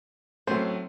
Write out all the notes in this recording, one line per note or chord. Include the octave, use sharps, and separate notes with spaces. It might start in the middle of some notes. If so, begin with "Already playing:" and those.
A2 F#3 A3 C4 C#4 C5